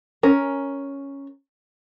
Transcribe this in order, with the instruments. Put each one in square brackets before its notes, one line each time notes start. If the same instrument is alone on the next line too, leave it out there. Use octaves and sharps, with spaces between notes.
[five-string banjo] C#4 A#4